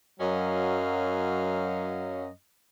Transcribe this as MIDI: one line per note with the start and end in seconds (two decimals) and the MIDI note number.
0.20 2.28 42
0.20 2.28 54
0.20 2.28 61
0.20 2.28 75
0.20 2.28 77